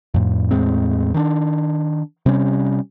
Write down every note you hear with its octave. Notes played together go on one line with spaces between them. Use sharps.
F2 A2
E2 A2 G#3 C4
D#3 D4
C3 G3 C#4